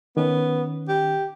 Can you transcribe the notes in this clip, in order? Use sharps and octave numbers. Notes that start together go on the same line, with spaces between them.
D#3 B3 C#4
G4